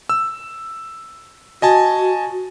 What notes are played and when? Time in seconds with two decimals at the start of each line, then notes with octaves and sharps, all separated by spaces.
0.09 E6
1.62 F#4 D#5 G#5 A5